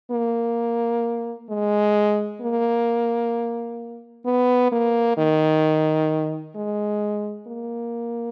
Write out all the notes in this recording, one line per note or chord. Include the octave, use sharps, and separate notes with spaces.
A#3
G#3
A#3
B3
A#3
D#3
G#3
A#3